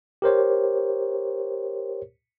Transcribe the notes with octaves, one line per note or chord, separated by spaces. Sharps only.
G4 A#4 C5 C#5